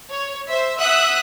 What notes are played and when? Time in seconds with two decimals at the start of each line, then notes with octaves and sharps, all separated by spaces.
0.10 C#5
0.47 C5 E5
0.78 E5 F#5 D#6 F#6